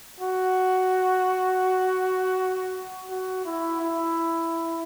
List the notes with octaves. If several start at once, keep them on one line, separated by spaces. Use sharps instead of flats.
F#4
F#4
E4
E4